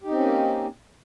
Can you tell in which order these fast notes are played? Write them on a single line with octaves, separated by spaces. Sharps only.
G4 D#4 C4 C#4 A#3